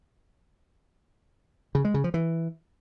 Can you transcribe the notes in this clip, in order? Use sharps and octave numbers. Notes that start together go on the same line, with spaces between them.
C#3
G#3
C#3
F3
E3